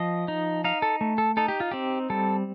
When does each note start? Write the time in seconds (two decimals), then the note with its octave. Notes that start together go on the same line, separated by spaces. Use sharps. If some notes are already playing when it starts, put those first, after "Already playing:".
Already playing: F3 D#5
0.28 D#4
0.64 D#4 F5
0.82 A4
1.01 A3
1.18 A4
1.37 D#4 A4
1.48 G4
1.60 F4
1.71 C4 G4
2.10 G3 A4